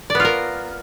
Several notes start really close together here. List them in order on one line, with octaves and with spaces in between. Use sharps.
D5 B3 F4 A#4